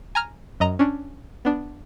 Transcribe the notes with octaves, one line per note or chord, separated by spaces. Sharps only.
G#5 A#5 F6
F#2 D#5 A#5
C#4 D4
B3 D4